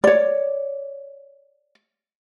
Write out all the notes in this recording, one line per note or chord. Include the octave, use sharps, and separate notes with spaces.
C#5 D5